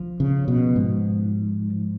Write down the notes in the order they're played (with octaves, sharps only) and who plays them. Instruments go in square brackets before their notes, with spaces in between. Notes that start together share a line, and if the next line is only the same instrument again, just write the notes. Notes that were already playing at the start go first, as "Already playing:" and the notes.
Already playing: [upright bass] F3
[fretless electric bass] C#3
B2
G#2